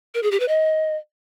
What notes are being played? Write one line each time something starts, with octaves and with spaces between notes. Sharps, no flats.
A#4
G#4
G4
B4
D#5